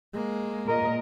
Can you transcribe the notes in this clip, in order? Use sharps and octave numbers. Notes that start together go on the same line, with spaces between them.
G#3 A#3
A#2 A#4 D#5